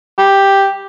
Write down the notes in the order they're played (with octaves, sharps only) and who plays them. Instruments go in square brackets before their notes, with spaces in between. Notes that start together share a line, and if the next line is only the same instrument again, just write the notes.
[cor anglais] G4